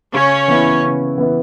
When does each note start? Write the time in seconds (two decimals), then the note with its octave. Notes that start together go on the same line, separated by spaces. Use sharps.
0.14 C#3 C#4 C#5
0.48 E3 B3 E4
0.83 C#3
1.18 E3 B3 E4